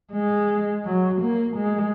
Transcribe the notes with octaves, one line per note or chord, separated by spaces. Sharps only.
G#3
F#3
A#3
G#3